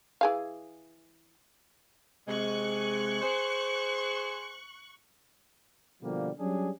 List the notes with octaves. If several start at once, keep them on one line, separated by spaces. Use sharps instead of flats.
E3 G#4 F5
C3 G#3 C#6 F#6
G#4 C5
B2 D3 F3 G3 A#3
F#3 G3 C#4 D4 G#4